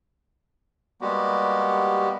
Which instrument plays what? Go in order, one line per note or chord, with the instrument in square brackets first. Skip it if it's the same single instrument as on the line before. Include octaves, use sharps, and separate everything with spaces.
[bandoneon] G3 G#3 A#3 B3 F#4 G4